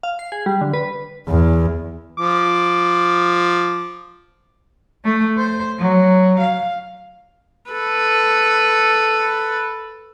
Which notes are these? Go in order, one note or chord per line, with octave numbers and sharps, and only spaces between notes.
F5
C7
G#4
G3
D3
B4
E2
F3 D6
A3
C5
F#3
F5
A4 B4